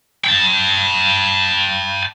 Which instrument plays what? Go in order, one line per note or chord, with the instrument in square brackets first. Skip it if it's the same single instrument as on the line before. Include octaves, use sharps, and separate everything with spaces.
[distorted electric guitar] G5 A5